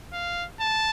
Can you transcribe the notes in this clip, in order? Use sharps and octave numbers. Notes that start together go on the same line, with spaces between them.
F5
A5